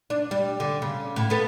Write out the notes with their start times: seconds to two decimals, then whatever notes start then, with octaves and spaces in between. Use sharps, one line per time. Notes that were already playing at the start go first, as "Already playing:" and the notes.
0.10 D4
0.31 G3
0.60 D3
0.82 C#3
1.16 A2
1.30 B3 A4